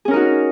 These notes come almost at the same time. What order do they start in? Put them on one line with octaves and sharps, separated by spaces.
G#4 C#4 A#4 D#4 F#4